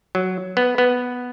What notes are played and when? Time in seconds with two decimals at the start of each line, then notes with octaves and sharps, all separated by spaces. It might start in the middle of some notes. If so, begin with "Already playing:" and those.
0.15 F#3
0.57 B3
0.78 B3